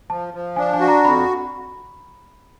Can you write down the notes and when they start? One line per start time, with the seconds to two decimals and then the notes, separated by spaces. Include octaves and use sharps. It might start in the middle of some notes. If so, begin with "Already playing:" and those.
0.10 F3 A5
0.34 F3
0.56 D4 G#5
0.73 G#5
0.80 F#4
0.88 A#5
1.04 F2 B5